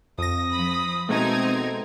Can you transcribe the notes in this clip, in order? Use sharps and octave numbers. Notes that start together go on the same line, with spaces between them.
F2 D#6 A#6
F3 B5
B2 G#3 A3 C4 D#4 G#6